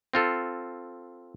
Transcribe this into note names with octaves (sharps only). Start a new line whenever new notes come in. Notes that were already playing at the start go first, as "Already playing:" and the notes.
C4 F4 A4